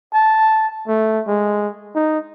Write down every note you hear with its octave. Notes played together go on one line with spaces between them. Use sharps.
A5
A3
G#3
D#4